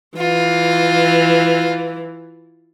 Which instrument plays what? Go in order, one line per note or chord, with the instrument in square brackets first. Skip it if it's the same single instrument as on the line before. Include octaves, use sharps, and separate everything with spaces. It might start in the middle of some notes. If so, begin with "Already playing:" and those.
[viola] E3 [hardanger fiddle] F4